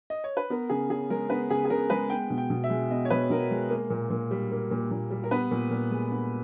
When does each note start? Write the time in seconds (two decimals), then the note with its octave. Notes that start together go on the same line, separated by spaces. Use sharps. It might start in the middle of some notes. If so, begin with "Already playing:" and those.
0.10 D#5
0.24 C#5
0.37 B4
0.50 B3 A#4
0.69 C#3 G#4
0.90 C#3 G#4
1.10 G#3 A#4
1.30 B3 B4
1.50 C#3 G#4
1.65 G#4
1.70 C#3 A#4
1.90 G#3 B4
2.10 B3 G5
2.30 B2
2.38 G5
2.50 B2
2.64 E5
2.70 G#3
2.91 B3 D#5
3.05 C#5
3.10 B2 B4
3.30 B2 A#4
3.51 G#3
3.70 A#3
3.90 A#2
4.10 A#2
4.31 G3
4.52 A#3
4.71 A#2
4.91 A#2
5.10 G3
5.24 A#4
5.31 B3 B4
5.51 A#2
5.71 A#2
5.91 G#3
6.12 B3